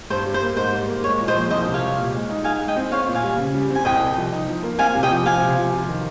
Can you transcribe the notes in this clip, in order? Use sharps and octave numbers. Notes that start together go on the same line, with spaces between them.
G2 C5
G3
C5
A#3
G#2 C5
G3
A#3
G#3 C#5
A#2
C5 D#5
F3
C2 C5 D#5
C3
C#5 F5
G3
A#2
G#3
D#4
D#4 F5 G#5
G#3
D#5 G5
C4
C4 C#5 F5
A#2
F5 G#5
G3
C#3
G3
C4 G#5
C2 D#5 G5
C3
F3
D#4
F3
A#3
C4 F5 G#5
C3
D#5 G5
F3
C4 F5 G#5
C3
F3
F4
D#3